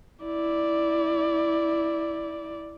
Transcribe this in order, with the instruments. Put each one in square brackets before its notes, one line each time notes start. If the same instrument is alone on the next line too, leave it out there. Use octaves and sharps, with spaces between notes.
[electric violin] E4 D5